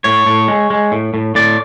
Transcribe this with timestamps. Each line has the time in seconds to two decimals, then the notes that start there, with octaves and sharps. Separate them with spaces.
0.04 A2 C#5
0.26 A2
0.48 G#3
0.70 G#3
0.92 A2
1.14 A2
1.35 A2 D5